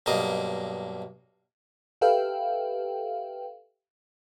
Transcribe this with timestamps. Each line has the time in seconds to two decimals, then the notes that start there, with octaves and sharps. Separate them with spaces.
0.06 B1 G2 A#3 D#5
2.01 G4 A4 B4 E5 F5 G5